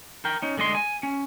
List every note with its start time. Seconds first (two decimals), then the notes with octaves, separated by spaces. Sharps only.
0.25 A#4 G5
0.42 C#4 D#4
0.57 D3 G#3 D#5 C6
0.75 G#5
1.03 C#4